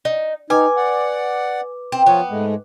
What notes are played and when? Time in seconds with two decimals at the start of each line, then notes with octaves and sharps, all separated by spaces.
0.05 D#4
0.50 D#4 B4 G#5 D6
0.77 D5 F#5
1.92 C4
2.06 F3 B3 F4 C#5
2.30 G#2 G#3 A3